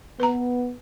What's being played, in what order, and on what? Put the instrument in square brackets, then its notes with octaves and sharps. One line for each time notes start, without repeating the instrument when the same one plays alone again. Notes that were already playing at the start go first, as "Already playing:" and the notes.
[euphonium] B3 [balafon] B4 A#5